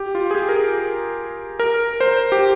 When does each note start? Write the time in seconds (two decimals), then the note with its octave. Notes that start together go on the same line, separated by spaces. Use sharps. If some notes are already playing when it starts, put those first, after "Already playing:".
Already playing: G4
0.15 F4
0.31 G#4
0.35 G4
0.49 A#4
0.56 G#4
1.60 A#4
2.01 C5
2.32 G4